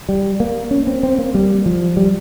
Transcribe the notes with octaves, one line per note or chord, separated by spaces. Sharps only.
G3
A#3
C#4
C4
C4
A#3
G3
F3
G3